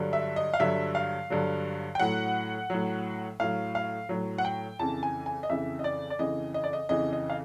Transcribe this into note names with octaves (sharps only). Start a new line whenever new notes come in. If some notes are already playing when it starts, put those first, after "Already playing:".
Already playing: G2 D3 F#3
E5
D#5
F5
G2 D3 F#3 E5
F5
G2 D3 F#3
G5
A2 F#3 F#5
A2 F#3
A2 F#3 F5
F5
A2 F#3
F#5
G5
F2 C#3 E3 A5
G#5
G#5
D#5
F2 C#3 E3 E5
D#5
D5
D5
F2 C#3 E3 D#5
D#5
D5
D#5
F2 C#3 E3 D#5
D#5
F5